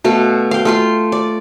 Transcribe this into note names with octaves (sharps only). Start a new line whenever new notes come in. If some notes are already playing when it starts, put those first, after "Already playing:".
B2 A3 F5
F5 G5
A3 F4 C6
D5